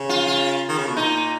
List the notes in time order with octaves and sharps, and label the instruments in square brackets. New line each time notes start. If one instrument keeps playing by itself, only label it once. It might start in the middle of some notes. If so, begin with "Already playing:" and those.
Already playing: [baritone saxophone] C#3
[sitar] F4
F4
[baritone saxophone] D#3
C#3
B2
[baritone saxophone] A#2 [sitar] D#4